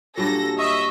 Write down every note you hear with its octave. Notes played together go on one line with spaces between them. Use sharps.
G2 A#2 F#3 A4 A#6
D#5 E5 C#6